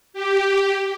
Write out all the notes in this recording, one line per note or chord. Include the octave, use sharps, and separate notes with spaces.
G4